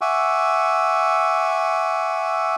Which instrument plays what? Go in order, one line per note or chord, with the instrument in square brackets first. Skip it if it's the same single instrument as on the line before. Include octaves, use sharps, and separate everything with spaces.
[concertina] E5 F#5 G#5 C#6 D6 E6